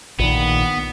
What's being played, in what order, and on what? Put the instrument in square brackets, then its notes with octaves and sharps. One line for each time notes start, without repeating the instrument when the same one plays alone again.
[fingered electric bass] A#1 A#2 D#3 [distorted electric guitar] B3